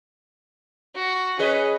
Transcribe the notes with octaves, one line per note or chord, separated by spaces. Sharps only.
F#4
C#4 G#4 B4 D#5